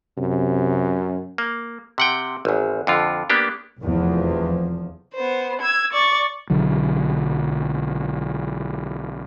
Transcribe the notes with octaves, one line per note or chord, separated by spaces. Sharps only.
F#2 C3
A#3
C3 F#5 G5
G#1 E2
F2 D3 F4
A#3 B3 D4 G4
F1 E2 F3
B3 C5
E6 G#6
D5 C#6 A6
B1 D3 F#3